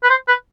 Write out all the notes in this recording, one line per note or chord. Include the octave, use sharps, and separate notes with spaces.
B4
C5
B4